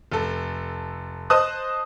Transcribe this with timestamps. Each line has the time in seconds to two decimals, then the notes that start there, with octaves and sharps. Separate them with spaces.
0.12 F1 A4
1.30 C5 D#5 A5 D#6 F#6